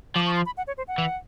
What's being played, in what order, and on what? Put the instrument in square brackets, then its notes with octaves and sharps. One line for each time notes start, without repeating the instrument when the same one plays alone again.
[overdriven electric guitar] F3 [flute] D6
[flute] C#6
C6
B5
F#5
C#5
C5
F#5
[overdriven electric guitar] E3